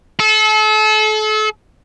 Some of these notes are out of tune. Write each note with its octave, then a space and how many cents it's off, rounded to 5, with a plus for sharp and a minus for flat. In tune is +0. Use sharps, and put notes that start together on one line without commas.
A4 -35